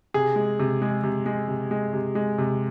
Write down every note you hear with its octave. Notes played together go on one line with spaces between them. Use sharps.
C3 G#4
G#3
C3
G#3
C3
G#3
C3
G#3
C3
G#3
C3